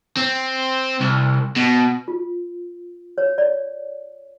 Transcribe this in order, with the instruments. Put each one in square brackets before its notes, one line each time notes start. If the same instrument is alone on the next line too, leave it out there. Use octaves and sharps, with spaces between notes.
[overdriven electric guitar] C4
C2
B2
[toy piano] F4
C#5
D5